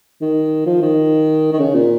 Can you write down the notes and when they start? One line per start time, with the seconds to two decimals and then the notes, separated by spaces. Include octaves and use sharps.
0.21 D#3
0.66 F3
0.81 D#3
1.52 D#3
1.59 C#3
1.75 A#2